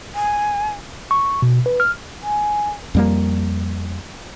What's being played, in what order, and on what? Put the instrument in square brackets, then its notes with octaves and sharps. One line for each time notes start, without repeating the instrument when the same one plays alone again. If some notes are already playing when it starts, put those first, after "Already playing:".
[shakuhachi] G#5
[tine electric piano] C#6
B2
B4
F6
[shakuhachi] G#5
[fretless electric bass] F2 G3 A#3